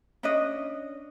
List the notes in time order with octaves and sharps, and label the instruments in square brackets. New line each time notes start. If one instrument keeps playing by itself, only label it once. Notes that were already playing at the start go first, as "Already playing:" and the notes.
[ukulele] C#4 D4 D#5